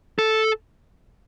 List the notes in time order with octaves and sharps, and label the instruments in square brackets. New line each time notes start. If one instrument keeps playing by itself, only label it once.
[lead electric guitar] A4